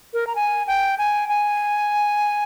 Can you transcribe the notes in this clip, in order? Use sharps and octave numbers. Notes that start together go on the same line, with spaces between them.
A#4
A#5
G#5
G5
G#5
G#5